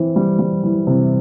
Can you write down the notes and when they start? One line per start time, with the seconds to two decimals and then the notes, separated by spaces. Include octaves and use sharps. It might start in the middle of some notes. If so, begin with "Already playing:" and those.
Already playing: E3 C4
0.16 G3
0.39 G3
0.64 E3
0.87 C3